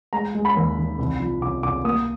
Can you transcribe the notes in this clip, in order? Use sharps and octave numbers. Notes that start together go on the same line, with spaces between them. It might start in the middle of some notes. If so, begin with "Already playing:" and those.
G#3 A#5
G#3
B5
D#2
D#3
C2
F3
C2 D6
C2 D6
A#3 D#6